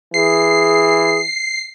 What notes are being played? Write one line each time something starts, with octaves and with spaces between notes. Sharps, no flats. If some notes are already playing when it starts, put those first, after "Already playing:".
E3 G#4 C7